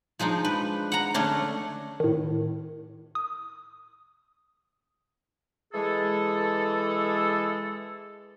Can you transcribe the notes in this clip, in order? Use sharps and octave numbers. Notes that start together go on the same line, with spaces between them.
F3 G#3 D4 D#4
B4
F#5 A#5
D3 A3 C#4 D4
A2 D#3
D#6
E3 G#3 G#4 A4